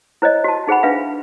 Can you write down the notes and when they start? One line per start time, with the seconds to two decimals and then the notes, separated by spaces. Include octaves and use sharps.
0.22 E4 C5 C#5 D#5
0.44 F#4 A5
0.67 D#4 G#4 C5 F#5 B5
0.83 D4 B4 E5 F5